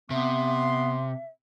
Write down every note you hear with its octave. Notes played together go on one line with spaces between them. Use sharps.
C3 B3 E5 C6